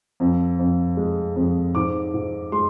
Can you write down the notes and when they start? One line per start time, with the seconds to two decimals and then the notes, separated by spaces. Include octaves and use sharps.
0.20 F2
0.59 F2
0.97 G#3
1.36 F2
1.75 G#2 D6
2.14 G#2
2.52 G#3 C6